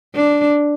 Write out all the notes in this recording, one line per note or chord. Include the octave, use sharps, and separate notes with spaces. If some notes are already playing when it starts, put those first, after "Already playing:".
D4